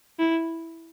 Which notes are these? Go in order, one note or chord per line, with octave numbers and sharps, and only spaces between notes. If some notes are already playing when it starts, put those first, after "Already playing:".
E4